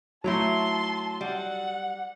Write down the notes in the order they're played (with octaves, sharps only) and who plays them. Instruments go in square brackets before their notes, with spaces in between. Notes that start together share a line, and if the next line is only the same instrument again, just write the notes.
[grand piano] F#3 [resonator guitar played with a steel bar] A3 E4 A#5 [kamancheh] A5 C6
[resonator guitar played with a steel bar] G3 [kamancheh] F#5